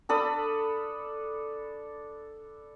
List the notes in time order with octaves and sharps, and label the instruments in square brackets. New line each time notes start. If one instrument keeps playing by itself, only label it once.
[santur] D4 A4 B5 D#6